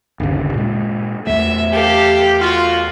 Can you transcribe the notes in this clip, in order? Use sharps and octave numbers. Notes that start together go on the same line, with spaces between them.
G1 D#2 C#3
A#2 G#3
E2 A3 E5
G4 A4 F5
F4 F#4